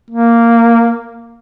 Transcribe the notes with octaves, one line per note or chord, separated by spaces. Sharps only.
A#3